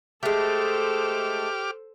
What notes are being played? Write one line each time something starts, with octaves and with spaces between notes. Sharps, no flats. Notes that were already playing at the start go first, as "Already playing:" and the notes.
G#3 A3 G4 A4 C5 D6 F6